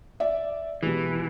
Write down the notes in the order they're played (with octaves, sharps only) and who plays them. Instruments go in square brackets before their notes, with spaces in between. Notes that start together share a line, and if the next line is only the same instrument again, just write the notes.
[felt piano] D5 E5
[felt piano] B2 G3 G#3 [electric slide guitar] E3